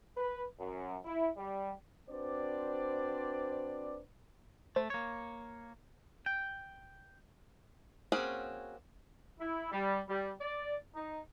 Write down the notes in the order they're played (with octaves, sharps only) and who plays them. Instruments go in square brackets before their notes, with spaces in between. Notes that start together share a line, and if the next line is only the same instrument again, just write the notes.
[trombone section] B4
F#2
E4
G3
[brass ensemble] C4 D4 F#4 B4 C5 D5
[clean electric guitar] A3 [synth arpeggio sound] C5
[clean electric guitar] A#3 C#5
G5
[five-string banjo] A#3 C4 C#4 F#4 G#4
[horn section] E4
G3
G3
D5
D#4